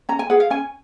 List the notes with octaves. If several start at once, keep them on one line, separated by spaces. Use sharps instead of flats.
C#4 A#5
G#5
G#4 B4 F#5
F5
C#4 G#5